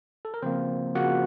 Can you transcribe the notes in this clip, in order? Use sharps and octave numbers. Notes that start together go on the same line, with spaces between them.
A4
A#4
C#3 F3 A#3 C4 C5
C#3 F3 A#3 F#4 F#5